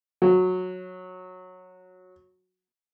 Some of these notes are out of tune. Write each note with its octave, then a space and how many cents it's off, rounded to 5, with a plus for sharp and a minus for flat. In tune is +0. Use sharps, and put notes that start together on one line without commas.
F#3 -15